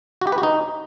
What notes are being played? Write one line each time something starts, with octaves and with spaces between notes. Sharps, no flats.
F#4
G4
B4
F#4
D#4